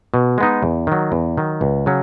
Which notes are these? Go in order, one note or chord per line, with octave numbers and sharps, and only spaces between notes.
B2
G#3 B3 D#4
E2
D#3 F#3
E2
D#3 F#3
C#2
C#3 F#3 C#4